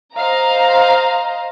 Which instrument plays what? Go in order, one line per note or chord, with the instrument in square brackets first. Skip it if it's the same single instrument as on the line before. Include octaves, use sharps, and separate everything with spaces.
[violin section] C5 D#5 F5 A#5